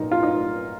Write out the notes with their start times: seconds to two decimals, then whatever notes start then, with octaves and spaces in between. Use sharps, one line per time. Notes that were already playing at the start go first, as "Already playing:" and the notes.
Already playing: A#2 F#3 D#4 A#4
0.12 F4
0.23 D#4